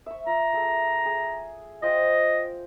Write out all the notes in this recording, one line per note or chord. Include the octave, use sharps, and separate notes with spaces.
E5 C#6
F4 A#5
A3 G#4 E5
G#4
F4 C5 D#5 G5